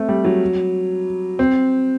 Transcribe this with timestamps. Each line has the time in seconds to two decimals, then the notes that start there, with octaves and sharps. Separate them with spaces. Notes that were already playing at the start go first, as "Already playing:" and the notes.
Already playing: A3 C4
0.09 G3
0.25 F#3
1.39 C4